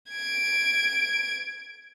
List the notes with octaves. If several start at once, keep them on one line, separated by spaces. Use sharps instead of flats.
G#6 D7